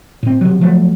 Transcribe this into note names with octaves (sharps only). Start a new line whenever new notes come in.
A2 C4
C3 F#3
F3 F#3 A3